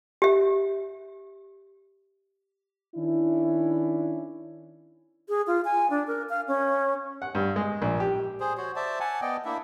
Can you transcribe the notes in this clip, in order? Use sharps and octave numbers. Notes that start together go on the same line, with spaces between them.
G4 E5
D#3 C#4 D4 E4
G#4
F4
G#5
D4
A#4
F5
C#4
F#5
G2
G#3
A#1
G4
G#4 C5
F#4 C5 C#5
C5 D5 E5 A5
F#5 G#5 A5
B3 D5 D#5 G5
A#3 D4 E4 E5